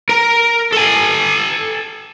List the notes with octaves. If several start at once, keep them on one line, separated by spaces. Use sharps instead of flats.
A#4
A4 G#5